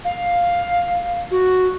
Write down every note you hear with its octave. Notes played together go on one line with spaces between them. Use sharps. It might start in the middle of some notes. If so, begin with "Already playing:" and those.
F5
F#4